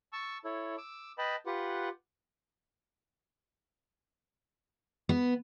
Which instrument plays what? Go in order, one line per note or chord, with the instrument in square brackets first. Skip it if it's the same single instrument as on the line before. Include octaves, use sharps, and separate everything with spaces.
[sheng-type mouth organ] A5 C#6 E6
E4 A4 C#5
D6 E6
B4 D#5 G5 A5 B5
F4 G4 B4 F#5
[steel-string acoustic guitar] B3